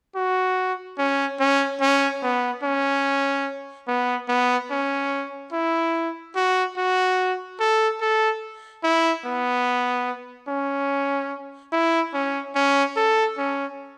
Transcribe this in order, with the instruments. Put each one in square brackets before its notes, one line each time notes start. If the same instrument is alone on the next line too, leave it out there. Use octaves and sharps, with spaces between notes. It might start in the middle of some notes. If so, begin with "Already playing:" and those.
[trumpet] F#4
C#4
C#4
C#4
B3
C#4
B3
B3
C#4
E4
F#4
F#4
A4
A4
E4
B3
C#4
E4
C#4
C#4
A4
C#4